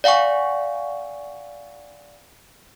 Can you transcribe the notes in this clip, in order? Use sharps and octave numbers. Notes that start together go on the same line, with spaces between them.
D5 F5 F#5 G#5 C#6